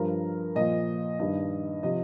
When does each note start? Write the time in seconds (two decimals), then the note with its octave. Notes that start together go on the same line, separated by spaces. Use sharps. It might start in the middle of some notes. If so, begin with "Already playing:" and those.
Already playing: G2 F3 A#4
0.55 A#2 F3 D#5
1.19 G2 D#3 D#5
1.83 C3 F3 D#5